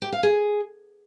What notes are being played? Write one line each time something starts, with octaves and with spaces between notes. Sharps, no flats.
G4
F5
G#4